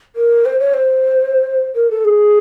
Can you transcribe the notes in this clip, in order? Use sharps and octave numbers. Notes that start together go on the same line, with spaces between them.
A#4
C5
C#5
C5
A#4
A4
G#4